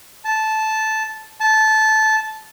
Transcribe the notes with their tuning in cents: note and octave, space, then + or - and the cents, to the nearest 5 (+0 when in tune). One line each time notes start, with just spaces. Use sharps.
A5 -10
A5 -15